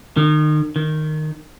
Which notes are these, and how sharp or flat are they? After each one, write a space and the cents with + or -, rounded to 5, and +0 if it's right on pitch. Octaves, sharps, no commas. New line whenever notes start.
D#3 -35
D#3 -10